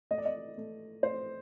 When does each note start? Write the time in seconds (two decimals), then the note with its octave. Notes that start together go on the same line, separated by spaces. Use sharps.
0.11 A3 D#5
0.18 D5
0.25 D#5
0.58 A3
1.03 A3 C5